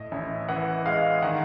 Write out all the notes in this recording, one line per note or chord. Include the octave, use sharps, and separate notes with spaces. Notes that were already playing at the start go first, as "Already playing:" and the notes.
Already playing: A2 D#5
A1 E5
E3 F#5
G#3 F5
D#3 F#5